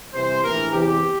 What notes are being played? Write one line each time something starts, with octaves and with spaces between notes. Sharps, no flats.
C2 C3 E3 C5
A#1 A2 E3 A#4
E2 C3 E3 G4